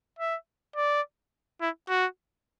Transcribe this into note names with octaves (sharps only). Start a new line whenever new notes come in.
E5
D5
E4
F#4